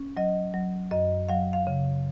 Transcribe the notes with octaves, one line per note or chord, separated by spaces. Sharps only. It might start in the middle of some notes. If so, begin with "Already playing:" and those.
Already playing: C#4
F#3 D#5
F#3
F#2 D#5
F#3 F5
F5
C#3